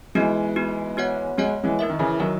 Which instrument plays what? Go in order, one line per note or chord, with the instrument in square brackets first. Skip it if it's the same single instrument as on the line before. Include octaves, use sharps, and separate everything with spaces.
[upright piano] E3 G#3 [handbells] B3 D#4 F#4
[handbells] B3 D#4 F#4
B3 F#4 C#5 F#5
[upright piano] G#3 [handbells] B3 F#4 C#5 F#5
[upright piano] E3 G#3
[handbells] A#3 E4 A#4 E5
[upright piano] D#3
C#3 E3
[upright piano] D#3 F#3 [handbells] A#3 E4 A#4 E5